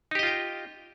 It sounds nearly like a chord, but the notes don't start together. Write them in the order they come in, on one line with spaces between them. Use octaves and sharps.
D#4 G4 D#5 F4 G5